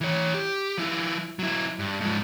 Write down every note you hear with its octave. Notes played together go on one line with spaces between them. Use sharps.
E3 C#5
G4
F3 E4
F#3 E4
G2
G#2 F3